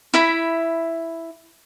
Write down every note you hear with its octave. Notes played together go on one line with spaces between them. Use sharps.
E4 E5 B5